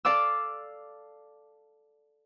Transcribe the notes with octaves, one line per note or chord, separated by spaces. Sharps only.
A4 D5 F5 D6 E6